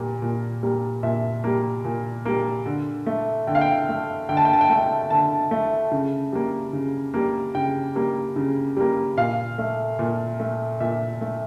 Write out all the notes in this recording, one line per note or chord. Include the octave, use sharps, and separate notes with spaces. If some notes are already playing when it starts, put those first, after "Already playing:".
Already playing: A#2 G3 A#3
A#2
G3 A#3
A#2 E5
G3 A#3
A#2
G3 A#3
D3
A3
D3 G5
F5
G5
A3
D3 G5
A5
G5
A5
G5
A3 A5
G5
D3 A5
A3
C#3
G3 A#3
C#3
G3 A#3
C#3 G5
G3 A#3
C#3
G3 A#3
A#2 F5
A3
A#2
A3
A#2 E5
A3